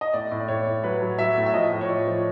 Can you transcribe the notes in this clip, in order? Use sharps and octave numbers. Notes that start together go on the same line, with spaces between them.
D#5
A2 D5
A2
D5
A2 C#5
A2
F#3 B4
F#3
F#3 E5
A2
E5
F3 D#5
A2
C#5
F3 D5
F3
C#5